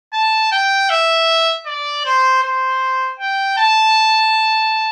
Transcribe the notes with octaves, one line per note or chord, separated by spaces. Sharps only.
A5
G5
E5
D5
C5
C5
G5
A5